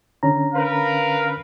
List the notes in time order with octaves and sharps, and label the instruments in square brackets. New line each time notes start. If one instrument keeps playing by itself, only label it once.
[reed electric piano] D3 C#4 A#5
[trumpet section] A#4 B4 F5